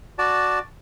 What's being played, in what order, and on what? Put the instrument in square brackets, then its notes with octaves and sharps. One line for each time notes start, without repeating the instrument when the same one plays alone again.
[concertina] F#4 D5 A5